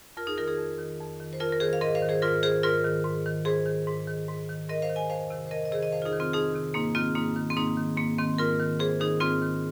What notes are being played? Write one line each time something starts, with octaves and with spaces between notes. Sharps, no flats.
F2 F4 A#4
D#4 G#4
D#3 F4 A#4
D#4 G#4
F2
D#3
F2
D#3
C5
F2 F4 A#4
A#4
D#3 G#4 C5
F5
G#2 A#4 D#5
C5 F5
D#3
G#4 C5
G#2 F4 A#4
D#3 G#4 C5
G#2 F4 A#4
D#3
G#2
D#3
G#2 G#4 C5
D#3
G#2
D#3
G#2
D#3
G#2 A#4 D#5
C5 F5
D#3
D#5 G#5
F2 C5 F5
C3 D#3
C5
F2 A#4 D#5
D#5
C3 D#3 G#4 C5
D#5
F2 C5 F5
F4
D#4 G#4
D#3
C3 C4 F4
F2 D#4 G#4
C3 D#3
G#2 A#3 D#4
D#3 C4 F4
G#2 A#3 D#4
D#3
C4
G#2 A#3 D#4
D#3
G#2 A#3
D#3 C4
G#2 F4 A#4
D#3
G#2 G#4 C5
D#3 D#4 G#4
G#2 C4 F4
D#3